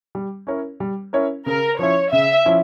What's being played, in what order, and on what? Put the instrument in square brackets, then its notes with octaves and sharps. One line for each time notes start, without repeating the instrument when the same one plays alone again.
[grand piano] G3
C#4 E4 A#4 C#5
G3
C#4 E4 A#4 C#5
[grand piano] C#3 [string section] A#4
[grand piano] F3 C#4 E4 [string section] C#5
[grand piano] C#3 [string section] E5
[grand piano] F3 C#4 E4